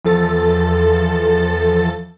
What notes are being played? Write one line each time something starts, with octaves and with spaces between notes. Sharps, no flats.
E2 F3 A4 A6